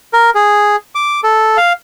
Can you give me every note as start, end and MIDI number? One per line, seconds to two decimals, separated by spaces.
0.13 0.30 70
0.35 0.76 68
0.95 1.21 86
1.24 1.57 69
1.57 1.73 77